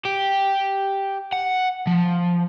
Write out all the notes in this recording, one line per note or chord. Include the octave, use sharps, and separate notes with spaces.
G4
F#5
F3